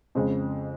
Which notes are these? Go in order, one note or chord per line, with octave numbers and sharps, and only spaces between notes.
F2 C#3 G#3 C5